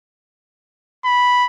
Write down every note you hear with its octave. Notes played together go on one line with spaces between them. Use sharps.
B5